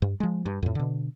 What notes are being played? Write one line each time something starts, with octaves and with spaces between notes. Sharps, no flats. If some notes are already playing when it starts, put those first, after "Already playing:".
G2
F3 G#3
G2
F2 A2
B2 D3